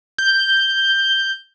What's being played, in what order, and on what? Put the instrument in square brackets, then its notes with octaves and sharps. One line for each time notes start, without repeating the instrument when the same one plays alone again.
[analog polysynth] G6